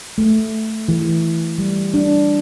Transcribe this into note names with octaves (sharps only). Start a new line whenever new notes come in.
A3
E3
G3
D4